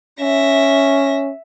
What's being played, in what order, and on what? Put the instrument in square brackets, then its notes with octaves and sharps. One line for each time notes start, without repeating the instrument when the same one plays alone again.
[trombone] C#4 [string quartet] E5 A#6